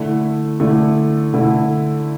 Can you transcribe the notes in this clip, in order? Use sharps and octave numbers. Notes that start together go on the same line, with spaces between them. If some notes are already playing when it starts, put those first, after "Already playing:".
Already playing: D3 A3 E4
D3 A3 E4
D3 A3 E4